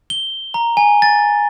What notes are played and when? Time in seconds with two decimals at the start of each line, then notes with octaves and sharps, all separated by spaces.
0.10 G7
0.54 A#5
0.77 G#5
1.02 A6